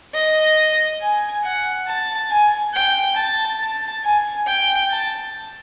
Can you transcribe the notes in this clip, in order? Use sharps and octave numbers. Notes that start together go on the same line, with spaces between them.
D#5
G#5
F#5
A5
G#5
G5
A5
A5
G#5
G5
A5